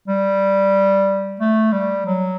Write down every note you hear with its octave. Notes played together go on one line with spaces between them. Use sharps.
G3
A3
G3
F#3